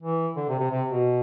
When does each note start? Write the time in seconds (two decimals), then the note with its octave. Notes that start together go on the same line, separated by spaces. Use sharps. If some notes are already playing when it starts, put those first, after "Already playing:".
0.03 E3
0.36 D3
0.49 C3
0.59 C3
0.71 C3
0.89 B2